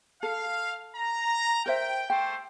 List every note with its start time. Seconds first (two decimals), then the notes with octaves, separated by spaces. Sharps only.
0.23 A4 F5
0.96 A#5
1.66 A#4 C5 E5 G5
2.10 A3 G4 C5 G5